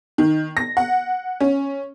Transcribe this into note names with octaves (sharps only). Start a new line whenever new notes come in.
D#3
A#6
F#5
C#4